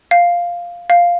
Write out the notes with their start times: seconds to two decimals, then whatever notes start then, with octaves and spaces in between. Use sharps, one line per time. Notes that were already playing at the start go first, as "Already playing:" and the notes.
0.11 F5
0.90 F5